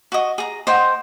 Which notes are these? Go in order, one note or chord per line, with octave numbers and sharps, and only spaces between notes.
F#4 D#5
G#4 A#5
C5 D#5 F#5 G5